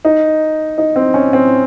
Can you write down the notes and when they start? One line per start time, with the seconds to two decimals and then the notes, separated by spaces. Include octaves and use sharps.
0.05 D#4
0.78 D#4
0.96 C4
1.14 C#4
1.33 C4